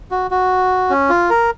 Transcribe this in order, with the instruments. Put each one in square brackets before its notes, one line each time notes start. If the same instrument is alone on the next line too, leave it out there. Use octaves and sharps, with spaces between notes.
[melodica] F#4
F#4
C#4
F4
A#4